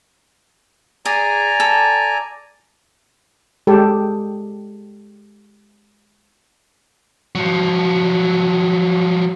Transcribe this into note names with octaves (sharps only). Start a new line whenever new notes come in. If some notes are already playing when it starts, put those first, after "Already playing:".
G#4 D5 G#5 A#5
A4
G#3 G4 A4
F3 F#3